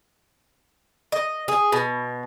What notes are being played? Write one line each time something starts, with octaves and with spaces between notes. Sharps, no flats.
D#5
G#4
B2